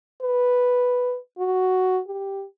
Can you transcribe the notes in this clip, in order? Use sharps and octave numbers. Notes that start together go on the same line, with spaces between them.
B4
F#4
G4